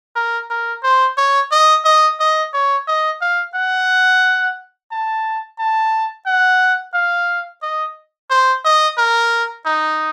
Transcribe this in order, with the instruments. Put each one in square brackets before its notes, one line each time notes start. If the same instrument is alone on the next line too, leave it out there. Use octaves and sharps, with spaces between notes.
[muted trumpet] A#4
A#4
C5
C#5
D#5
D#5
D#5
C#5
D#5
F5
F#5
A5
A5
F#5
F5
D#5
C5
D#5
A#4
D#4